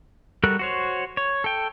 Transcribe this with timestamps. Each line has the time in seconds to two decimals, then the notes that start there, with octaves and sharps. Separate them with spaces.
0.44 G3 F#4 A4 A#4 F#6
0.59 F#4 C5 C#5
1.17 C#5
1.44 A4 G5